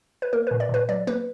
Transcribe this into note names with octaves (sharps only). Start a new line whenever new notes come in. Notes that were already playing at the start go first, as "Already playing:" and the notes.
B4
A#3 A#4
A#2 B4
D5
A#2 B4
F#3 D5
A#3 B4